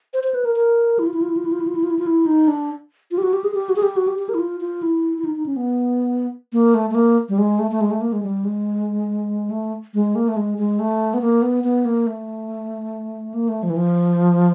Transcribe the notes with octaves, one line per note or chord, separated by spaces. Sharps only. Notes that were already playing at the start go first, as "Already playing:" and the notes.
C5
C5
B4
A#4
A#4
E4
F4
E4
F4
E4
F4
E4
F4
E4
F4
E4
F4
E4
F4
E4
D#4
D4
F4
G4
F#4
G4
G#4
G4
F#4
G#4
G4
F#4
G4
G4
A#4
E4
F4
F4
E4
E4
D#4
D#4
C#4
B3
A#3
A3
A3
A#3
G3
G#3
A3
A3
G#3
A3
A#3
G#3
G3
G#3
A3
G#3
A#3
A3
G#3
G#3
A3
B3
A#3
B3
B3
A#3
A3
A#3
A3
F3
E3
F3